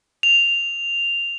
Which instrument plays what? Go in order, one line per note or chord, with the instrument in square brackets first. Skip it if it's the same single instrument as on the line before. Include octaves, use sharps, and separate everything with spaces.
[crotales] F7